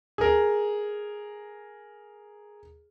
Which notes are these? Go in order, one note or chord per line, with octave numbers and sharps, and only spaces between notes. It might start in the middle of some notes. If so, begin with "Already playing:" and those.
G#4 A#4